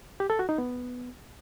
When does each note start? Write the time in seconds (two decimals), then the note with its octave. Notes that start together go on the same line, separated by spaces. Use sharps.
0.20 G4
0.30 A4
0.39 F#4
0.49 D#4
0.58 B3